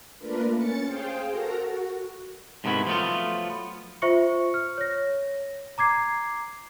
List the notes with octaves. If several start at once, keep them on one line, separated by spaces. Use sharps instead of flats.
A3 A#3 D4 F4 A#4 B4
C#4 A6 C#7
G#4 C5 F5 G5
F#4 A4 A#4 A#5
F#4
G#2 C3 D#3 B3 E4
F3 F#3 A3 B3 F4
F4 C5 E5 C#6 C#7
F6
C#5 A#6
A#5 D6 G#6 C7